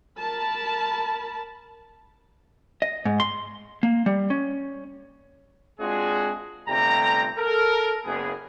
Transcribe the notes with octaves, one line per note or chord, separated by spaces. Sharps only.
A#4 A5 B5
D#5
G#2
C6
A#3
G3
C#4
G#3 C4 D4 F4 F#4 G#4
G1 C3 G3 A3 G5 A#5
A4 A#4
F#1 B3 G#4